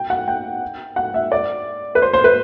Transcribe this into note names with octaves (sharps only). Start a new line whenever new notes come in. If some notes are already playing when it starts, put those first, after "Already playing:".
Already playing: G5
F#5
G5
F#5
E5
D5
B4
C5
C5
B4